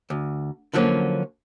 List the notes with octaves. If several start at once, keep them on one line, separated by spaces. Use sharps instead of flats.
D2
D3 F3 F#3 G#3 A#3 C#4